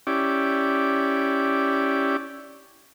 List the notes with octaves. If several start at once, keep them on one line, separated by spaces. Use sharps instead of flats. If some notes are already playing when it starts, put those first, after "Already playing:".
C#4 E4 G4 D5